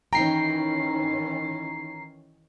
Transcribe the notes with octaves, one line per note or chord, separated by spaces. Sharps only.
D#3 E3 C#4 D#4 E4 G5 A#5 C7